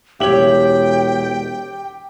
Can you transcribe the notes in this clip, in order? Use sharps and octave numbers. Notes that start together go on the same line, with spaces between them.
E1 G4 C#5 E5 G5 F#7